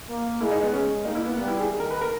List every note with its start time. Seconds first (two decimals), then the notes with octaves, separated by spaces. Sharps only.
0.09 A#3
0.41 G#3 E4
0.51 D#4
0.63 B3
0.72 G#3 C#4
1.05 A#3 D#4
1.15 E4
1.26 B3
1.37 G3 B3
1.48 E4
1.58 G#4
1.70 D#3 G#4
1.80 A#4
1.90 B4
2.01 A#4